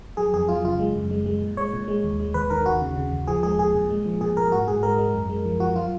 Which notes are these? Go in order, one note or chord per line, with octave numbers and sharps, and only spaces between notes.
F#3 G#4
F2 G#4
F#3 F4
C#3 F4
G#3
F#2
G#3
G#3
A#2
G#3 C#5
A#2
G#3
D#2
G#3
D#2 B4
D#3 A#4
D#2 F#4
C#3
C#3
D#2
F3 G#4
G#3 G#4
A#2 G#4
A#2
G#3
F3
A#2 G#4
A#2 A#4
G#2 F#4
G#2 G#4
G#3 A#4
G#3
F#2
G#3
F3
F3 F#4
F#3 F4